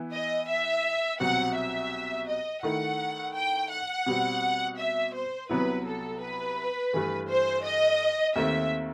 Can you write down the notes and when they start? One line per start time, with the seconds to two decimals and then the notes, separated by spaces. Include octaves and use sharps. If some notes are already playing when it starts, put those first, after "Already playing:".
Already playing: E3 B3 E4
0.12 D#5
0.49 E5
1.20 C2 B2 F#3 C4 F#4 F#5
1.56 E5
2.28 D#5
2.63 D#3 A3 E4 F#5
3.34 G5
3.71 F#5
4.06 B2 G3 C4
4.77 E5
5.14 C5
5.50 C2 C3 F#3 B3 E4 B4
5.85 A4
6.22 B4
6.93 G2 E3 A3
7.29 C5
7.64 D#5
8.36 D#2 D#3 A3 C4 E5